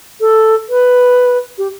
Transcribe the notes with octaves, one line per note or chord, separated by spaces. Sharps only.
A4
B4
G4